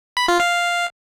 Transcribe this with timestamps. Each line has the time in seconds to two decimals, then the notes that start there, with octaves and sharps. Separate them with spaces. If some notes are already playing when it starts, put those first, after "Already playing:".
0.17 B5
0.28 F4
0.40 F5